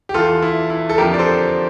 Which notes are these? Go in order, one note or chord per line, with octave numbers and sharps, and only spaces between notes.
G4
E2 E3 F4 A4
E4
E4
A4
F2 D3 F3 G4 A#4
D5
A4 C5